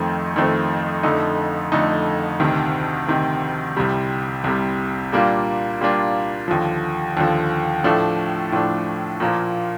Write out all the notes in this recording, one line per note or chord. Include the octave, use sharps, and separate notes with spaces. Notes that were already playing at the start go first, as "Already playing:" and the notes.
Already playing: F2 D#3 A3 C4
F2 D#3 A3 C4
F2 D3 A3 D#4
F2 D3 A3 D#4
D2 C3 D#3
D2 C3 D#3
C2 C3 G3
C2 C3 G3
A#2 G3 A#3 D4 F4
A#2 G3 A#3 D4 F4
D#2 D3 F3
D#2 D3 F3
A2 F3 A3 D4
A2 F3 A3 D4
A#2 F3 A#3